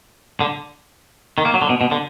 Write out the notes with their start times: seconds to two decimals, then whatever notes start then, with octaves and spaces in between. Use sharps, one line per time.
0.40 D3
1.38 D#3
1.45 A#3
1.54 F#3
1.62 D3
1.69 B2
1.81 B2
1.91 D3